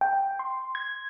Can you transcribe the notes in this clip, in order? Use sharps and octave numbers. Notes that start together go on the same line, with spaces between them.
G5
C6
G#6